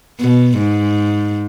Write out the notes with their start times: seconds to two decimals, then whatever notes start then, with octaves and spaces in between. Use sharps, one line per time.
0.20 B2
0.57 G#2